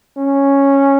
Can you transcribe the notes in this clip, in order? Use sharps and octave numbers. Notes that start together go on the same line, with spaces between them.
C#4